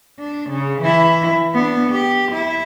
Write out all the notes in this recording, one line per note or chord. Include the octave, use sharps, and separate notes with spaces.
D4
C#3
E3 E4
B3 D4
G4
E4